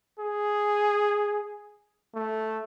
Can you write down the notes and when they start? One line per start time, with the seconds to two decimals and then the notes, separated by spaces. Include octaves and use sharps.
0.19 G#4
2.15 A3